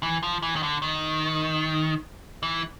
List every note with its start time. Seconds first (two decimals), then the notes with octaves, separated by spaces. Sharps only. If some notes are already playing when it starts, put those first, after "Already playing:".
0.03 E3
0.23 F3
0.43 E3
0.56 D#3
0.63 D3
0.82 D#3
2.43 E3